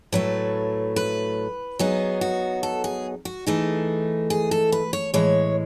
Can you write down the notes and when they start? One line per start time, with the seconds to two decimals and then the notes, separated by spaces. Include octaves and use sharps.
0.12 A2 F#3 A3 B4
0.96 B4
1.79 F#3 B3 D#4 G#4
2.21 F#4
2.63 A4
2.84 G#4
3.25 F#4
3.46 E3 A3 D#4 G#4
4.30 G#4
4.51 A4
4.72 B4
4.93 C#5
5.14 A2 E3 G#3 C#5